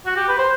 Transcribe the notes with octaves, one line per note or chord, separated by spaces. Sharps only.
F#4
G4
B4
C5